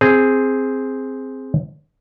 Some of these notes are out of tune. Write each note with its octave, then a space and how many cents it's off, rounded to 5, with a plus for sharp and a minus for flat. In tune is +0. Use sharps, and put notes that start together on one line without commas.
C4 +0 G#4 +0